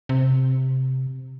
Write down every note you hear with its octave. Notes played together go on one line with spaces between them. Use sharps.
C3